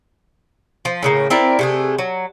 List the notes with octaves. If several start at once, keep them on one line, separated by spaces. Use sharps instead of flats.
F3
A2 C#3 A#3
C4 E4 A#4 D5
C3 A3 G#4
F#3